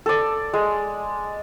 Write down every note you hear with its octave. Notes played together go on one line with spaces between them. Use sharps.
A4 D5
G#3